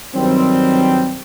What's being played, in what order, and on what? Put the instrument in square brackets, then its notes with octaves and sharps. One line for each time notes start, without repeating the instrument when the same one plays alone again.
[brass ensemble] G2 D#3 F#3 G3 C4